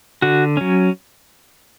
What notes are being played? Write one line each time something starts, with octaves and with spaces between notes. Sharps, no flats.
D3 F#4
F#3 C#4